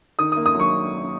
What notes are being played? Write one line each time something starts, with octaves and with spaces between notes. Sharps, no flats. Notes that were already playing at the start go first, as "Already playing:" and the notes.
D#3 D#6
D#6
A#3
D#6
F#3 C#6